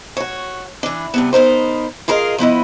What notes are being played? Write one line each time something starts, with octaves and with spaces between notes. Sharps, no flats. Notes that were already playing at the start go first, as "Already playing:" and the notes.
F#4 C#5
E3 D4
G2 C3 B3
B3 D#4 A#4 C5
F4 G#4 A#4 D#5 F5
F3 B3 E4 D#5